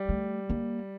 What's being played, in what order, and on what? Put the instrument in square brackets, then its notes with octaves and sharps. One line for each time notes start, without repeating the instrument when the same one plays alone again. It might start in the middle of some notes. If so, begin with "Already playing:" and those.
Already playing: [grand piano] G3
[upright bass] A3
A#3